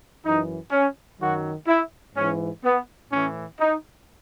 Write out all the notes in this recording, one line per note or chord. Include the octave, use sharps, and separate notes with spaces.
F#2 E3 D#4
C#4
F#2 D#3 F#3 F#4
E4
G#2 E3 C#4
B3
A2 E3 C#4
D#4